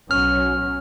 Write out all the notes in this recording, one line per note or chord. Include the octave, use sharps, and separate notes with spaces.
B1 F#3 C#4 F6